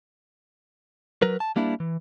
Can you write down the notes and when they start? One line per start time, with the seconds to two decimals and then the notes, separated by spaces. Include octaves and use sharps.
1.22 F#3 A#4 B4
1.40 A5
1.56 G3 A#3 D4 E4
1.80 E3